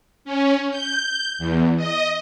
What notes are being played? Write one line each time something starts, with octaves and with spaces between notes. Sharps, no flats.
C#4
G6
E2
D#5